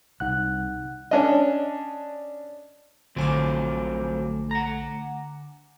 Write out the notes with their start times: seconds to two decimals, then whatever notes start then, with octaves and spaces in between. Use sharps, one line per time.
0.20 C2 D#4 F#5 F#6
1.11 C#4 D4 D#5
3.16 A#1 D3 F3 F#3 A3 C4 G#5 D6
4.51 F#5 A#5